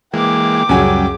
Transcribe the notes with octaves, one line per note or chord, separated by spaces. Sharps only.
E3 G#3 A#3 G5 D6
C#2 F#2 F#3 G3 G#5